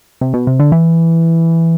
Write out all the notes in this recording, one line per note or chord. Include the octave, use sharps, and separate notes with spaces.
C3
B2
C3
D3
E3